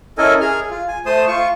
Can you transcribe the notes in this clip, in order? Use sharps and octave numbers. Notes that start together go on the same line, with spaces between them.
C#4 E4 A4 A#4 D#5 G#5
G#4 F6
F4
G#5
A3 C5 A5 C6 D#6
F4 C#6